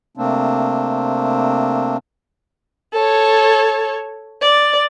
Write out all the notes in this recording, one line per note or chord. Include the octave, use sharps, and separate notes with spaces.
C3 A3 A#3 C4 D4
A4 C#5
D5